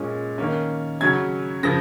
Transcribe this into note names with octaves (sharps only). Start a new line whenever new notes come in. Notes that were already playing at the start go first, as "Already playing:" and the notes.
Already playing: A#2 G#3 C#4
D#3 A#3 C#4
C#3 F#3 C#4 G#6
C#3 F3 A#6